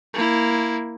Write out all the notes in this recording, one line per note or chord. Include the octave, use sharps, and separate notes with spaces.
A#3 E4